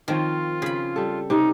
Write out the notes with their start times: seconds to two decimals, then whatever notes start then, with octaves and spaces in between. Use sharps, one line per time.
0.08 D#3 F3 C4 F4 C#5
0.62 C#3 G#4 B5
0.96 G3 A4
1.30 C3 D#4